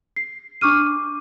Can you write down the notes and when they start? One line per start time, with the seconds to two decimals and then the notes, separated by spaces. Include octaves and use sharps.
0.16 C7
0.61 D4 C#6 D6 F6 D#7